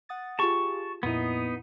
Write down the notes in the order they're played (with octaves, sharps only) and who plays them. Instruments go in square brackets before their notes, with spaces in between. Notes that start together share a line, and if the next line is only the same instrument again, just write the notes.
[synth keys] F#5 D#6 A6
[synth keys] F4 G4 G#4 [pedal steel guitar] A5 C#6
[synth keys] F2 A#2 E4 [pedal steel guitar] B3 D#4